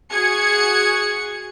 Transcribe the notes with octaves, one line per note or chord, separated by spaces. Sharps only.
F#4 G#4 G#6 C#7